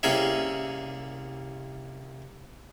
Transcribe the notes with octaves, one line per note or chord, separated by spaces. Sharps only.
C2 C3 A#3 C#4 G#4 E5